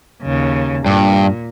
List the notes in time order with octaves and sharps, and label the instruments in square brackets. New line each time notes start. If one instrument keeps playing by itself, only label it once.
[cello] D#2 C#3
[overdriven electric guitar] G2 [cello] A#2